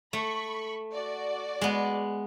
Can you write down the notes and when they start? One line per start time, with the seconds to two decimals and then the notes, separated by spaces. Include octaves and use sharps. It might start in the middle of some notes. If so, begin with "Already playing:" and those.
0.13 A3 B5 C#6
0.93 F#4 D5
1.61 G#3 B3